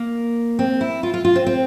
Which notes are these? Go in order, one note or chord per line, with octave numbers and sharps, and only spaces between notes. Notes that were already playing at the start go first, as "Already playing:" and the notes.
Already playing: A#3
C4
E4
F4
F4
F4
C4
C4